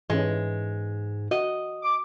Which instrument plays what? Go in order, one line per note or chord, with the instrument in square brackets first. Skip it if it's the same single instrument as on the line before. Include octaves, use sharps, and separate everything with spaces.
[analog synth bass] G#2 [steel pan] E3 C#4 [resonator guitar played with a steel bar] G#3
[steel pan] F#4 [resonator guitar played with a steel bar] D#5
[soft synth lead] D6